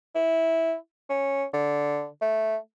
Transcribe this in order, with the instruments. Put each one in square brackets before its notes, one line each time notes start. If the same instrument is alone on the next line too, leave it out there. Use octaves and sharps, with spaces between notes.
[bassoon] E4
C#4
D3
A3